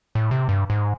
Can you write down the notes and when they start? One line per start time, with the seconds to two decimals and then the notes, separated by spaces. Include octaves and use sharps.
0.15 A2
0.31 C3
0.49 G2
0.70 G#2